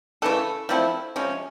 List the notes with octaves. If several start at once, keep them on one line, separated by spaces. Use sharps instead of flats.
C#3 E3 A3 A4
F3 A3 C4 E4
C3 F3 G#3 C#4